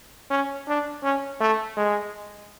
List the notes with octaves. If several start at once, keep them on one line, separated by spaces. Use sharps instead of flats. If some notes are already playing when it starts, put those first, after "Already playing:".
C#4
D4
C#4
A3
G#3